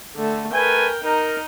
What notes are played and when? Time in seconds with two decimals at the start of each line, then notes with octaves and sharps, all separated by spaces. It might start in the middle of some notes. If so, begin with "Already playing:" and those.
0.16 D3 A3
0.54 A3 A#4 B4 G5 G#5
1.04 D#4 A#4